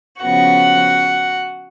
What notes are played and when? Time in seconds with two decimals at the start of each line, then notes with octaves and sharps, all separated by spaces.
0.21 C#3 F3 B3 F#4 F#5